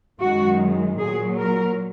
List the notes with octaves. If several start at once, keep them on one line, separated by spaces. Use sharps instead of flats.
F#2 D#3 G#3 F#4
A#2 F#3 G#4
A#4